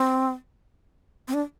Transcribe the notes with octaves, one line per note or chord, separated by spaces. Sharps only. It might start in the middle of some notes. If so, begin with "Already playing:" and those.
Already playing: C4
C4
D4